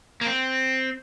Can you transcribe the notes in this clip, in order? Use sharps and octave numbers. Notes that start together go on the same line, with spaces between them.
A#3
C4